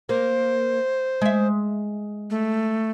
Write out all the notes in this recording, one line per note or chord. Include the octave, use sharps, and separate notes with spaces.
A#3 C5
G#3 E5
A3